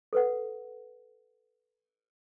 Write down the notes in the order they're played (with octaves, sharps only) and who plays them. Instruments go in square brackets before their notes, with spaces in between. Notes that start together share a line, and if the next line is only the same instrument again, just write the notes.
[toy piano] A4 B4 F#5